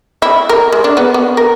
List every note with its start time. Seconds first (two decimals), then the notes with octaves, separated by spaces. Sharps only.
0.22 E4
0.49 A#4
0.72 G#3
0.84 D4
0.97 B3
1.14 B3
1.37 A#4